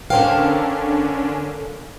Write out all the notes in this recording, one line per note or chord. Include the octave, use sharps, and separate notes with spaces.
D3 C#4 D4 A4 A#4 C5 F5 G5